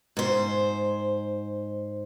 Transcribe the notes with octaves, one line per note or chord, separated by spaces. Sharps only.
G#2 C5